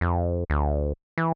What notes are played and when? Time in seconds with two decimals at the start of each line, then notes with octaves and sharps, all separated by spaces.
0.01 F2
0.50 D2
1.18 E3